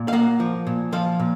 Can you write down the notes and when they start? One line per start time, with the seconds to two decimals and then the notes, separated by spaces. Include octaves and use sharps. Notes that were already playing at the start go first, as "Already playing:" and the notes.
Already playing: A#2
0.08 F5
0.13 A#3 F#5
0.40 F3
0.67 A#2
0.93 F3 F5
1.20 A#2